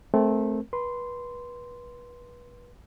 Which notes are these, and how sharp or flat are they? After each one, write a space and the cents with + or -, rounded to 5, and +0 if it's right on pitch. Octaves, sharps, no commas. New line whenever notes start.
A3 -20 C4 +0 A#4 +0
B4 -25 C6 -10